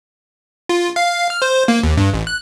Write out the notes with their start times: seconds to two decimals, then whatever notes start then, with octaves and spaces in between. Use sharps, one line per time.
0.69 F4
0.96 F5
1.30 F6
1.42 C5
1.68 A#3
1.83 D#2
1.97 G2
2.14 A1
2.27 F#6